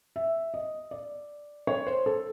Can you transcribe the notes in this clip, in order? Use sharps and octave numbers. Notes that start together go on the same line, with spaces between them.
E5
D#5
D5
C#5
C5
A4